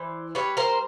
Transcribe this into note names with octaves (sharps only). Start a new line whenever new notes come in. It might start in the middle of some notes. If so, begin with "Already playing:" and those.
Already playing: E3 C5 D5
G3 B4 C#5
A#4 C5